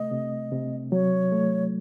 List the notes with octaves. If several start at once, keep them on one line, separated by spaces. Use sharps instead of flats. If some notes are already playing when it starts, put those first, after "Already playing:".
Already playing: C3 A3 D#5
C3
C3
F#3 C#5
A3